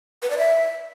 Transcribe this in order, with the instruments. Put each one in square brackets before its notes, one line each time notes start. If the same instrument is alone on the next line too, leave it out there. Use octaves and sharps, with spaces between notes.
[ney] B4
D5
E5